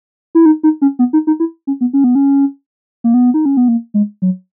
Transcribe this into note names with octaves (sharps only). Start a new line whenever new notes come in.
E4
D#4
D#4
C#4
B3
D#4
D#4
E4
C#4
B3
C#4
B3
C#4
A#3
B3
D#4
C#4
B3
A#3
G#3
F#3